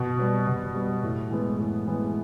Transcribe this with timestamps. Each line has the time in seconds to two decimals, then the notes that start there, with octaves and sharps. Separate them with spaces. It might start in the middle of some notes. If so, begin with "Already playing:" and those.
Already playing: B2
0.19 G3 B3
0.47 B2
0.75 G3 B3
1.03 A2
1.30 E3 G#3 B3
1.58 A2
1.87 E3 G#3 B3